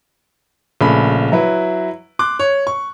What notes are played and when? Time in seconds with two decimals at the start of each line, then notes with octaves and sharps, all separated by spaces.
0.81 A#1 C#3 A3 B5
1.32 F#3 E4 B4
2.19 C6 D6 F#6
2.39 C#5
2.67 C#6